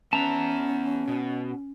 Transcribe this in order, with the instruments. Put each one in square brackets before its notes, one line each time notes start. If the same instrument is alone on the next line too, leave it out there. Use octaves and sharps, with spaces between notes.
[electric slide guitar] B3 E5 [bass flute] C#4 [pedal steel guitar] A5 A#5
[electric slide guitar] B2